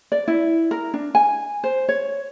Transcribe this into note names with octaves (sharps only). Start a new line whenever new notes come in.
D5
E4
A#4
D4
G#5
C5
C#5